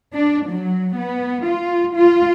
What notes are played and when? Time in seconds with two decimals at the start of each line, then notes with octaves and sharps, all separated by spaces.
0.15 D4
0.48 F#3
0.95 B3
1.46 F4
1.96 F4